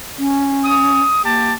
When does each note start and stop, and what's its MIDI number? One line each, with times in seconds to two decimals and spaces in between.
0.18 0.99 61
0.65 1.20 87
1.24 1.51 58
1.24 1.54 67
1.24 1.54 81